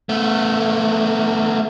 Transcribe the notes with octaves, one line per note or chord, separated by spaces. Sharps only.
A3 B3